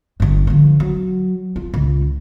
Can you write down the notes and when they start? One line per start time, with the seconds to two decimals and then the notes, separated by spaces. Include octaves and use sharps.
0.20 G1 G2
0.47 D3 F3
0.80 F#3
1.56 F4
1.74 C#2